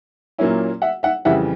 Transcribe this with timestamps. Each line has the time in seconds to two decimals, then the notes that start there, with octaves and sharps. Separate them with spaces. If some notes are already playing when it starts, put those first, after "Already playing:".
0.38 A#2 F#3 A#3 C#4 E4
0.82 E5 F#5
1.03 E5 F#5
1.25 F2 C#3 E3 G3 E5 F#5